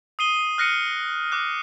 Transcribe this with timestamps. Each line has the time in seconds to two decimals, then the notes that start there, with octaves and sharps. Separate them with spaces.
0.19 D#6 C7 D#7 G7
0.58 F6 F#6 A#6 C7 C#7 D#7
1.32 D6 F#6